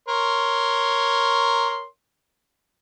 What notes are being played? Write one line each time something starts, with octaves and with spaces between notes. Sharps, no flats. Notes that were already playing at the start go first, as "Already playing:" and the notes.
A#4 C#5 C6